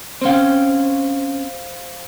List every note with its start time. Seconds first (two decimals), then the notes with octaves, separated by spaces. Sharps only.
0.21 C4 C#4 C5 F5 G5